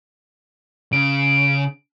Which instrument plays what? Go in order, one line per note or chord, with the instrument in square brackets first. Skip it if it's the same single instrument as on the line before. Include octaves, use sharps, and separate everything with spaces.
[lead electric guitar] C#3 [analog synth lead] D7